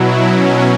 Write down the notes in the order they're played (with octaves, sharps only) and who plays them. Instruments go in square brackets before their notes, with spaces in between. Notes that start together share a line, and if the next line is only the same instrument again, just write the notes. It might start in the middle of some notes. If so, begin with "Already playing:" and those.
Already playing: [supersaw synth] B2 F#3 E4
C#4